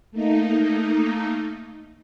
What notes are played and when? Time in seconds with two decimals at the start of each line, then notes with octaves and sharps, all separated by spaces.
0.11 A3 A#3 D#4